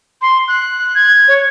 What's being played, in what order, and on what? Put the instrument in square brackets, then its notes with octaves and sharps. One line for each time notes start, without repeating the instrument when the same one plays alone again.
[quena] C6
F#6
[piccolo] G#6
[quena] C#5